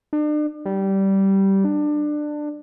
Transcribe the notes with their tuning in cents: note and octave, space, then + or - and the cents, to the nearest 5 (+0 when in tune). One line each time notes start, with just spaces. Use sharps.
D4 +40
G3 -15
D4 +20